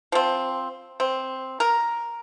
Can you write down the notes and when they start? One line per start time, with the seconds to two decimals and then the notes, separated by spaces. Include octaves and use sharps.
0.12 F3 C4
1.00 C4
1.60 A#4